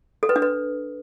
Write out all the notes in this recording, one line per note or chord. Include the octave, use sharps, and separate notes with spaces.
A4
B4
D4
B4